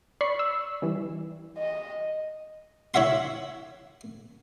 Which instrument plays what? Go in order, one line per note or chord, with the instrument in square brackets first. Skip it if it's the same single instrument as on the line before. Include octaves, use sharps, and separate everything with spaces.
[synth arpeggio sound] D5 B5 C#6 C7
E6
E3 G3
[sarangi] D#5
[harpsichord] E4 C#5 E5 F#5 C6